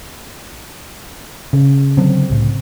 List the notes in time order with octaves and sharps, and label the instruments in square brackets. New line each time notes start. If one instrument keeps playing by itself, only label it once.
[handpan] C#3
[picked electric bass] D3 F#3 [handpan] C4
[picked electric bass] C2 A2